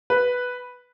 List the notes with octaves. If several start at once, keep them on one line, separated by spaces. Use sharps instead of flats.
B4